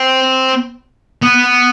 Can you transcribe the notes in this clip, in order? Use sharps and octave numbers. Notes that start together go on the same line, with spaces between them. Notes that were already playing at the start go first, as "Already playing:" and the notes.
Already playing: C4
B3